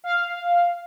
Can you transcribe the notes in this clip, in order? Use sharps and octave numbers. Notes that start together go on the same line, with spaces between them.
F5